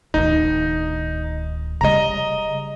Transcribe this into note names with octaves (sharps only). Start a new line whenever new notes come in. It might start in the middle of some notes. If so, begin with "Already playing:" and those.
D1 D#3 D#4
C#3 G3 D#5 A#5